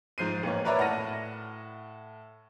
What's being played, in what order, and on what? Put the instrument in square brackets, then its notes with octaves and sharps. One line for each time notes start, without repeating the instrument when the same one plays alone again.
[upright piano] G#2 F3 G6 C7 D#7
A1 A#3 C#4
A#4 B4 C#5 D5 E5 A#5
A2 F#5 A5 F6 A#6 D#7